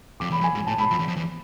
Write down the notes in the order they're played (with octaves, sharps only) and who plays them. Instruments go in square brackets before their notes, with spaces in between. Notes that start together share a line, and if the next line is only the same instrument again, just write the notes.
[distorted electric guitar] F2 [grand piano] D6
[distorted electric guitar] E2 [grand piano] B5
[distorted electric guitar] F2 [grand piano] G#5
[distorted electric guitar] G#2
[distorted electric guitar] A2 [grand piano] A5
[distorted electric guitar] G#2 [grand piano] B5
[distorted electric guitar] F2
E2
F2
E2